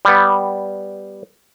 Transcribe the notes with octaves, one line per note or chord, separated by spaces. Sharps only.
G3 B3